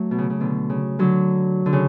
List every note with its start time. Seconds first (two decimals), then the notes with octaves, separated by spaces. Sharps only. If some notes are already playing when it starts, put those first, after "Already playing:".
Already playing: F#3 A3
0.11 B2
0.18 C#3
0.30 C#3
0.40 B2 D3
0.70 C#3
0.99 D3 F#3
1.66 D3
1.73 C#3